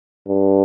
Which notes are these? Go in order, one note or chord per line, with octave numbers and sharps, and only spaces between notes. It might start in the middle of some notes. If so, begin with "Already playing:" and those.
G2